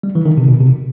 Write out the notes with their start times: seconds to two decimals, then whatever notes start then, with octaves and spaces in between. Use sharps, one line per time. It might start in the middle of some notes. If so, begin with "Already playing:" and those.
0.03 G3
0.15 E3
0.25 D#3
0.38 C3
0.48 B2
0.60 C3